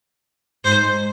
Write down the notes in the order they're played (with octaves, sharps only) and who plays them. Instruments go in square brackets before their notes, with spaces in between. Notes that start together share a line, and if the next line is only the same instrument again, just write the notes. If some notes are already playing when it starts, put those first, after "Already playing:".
[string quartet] G#2 [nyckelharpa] C5